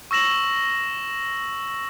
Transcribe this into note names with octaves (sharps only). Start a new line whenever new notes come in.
C#6 E6 A#6 E7 F#7